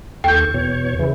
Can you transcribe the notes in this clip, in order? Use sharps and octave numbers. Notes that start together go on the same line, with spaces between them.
D#2 A4 G5 C#6 G6
E2 B2 C#5
C#3 E3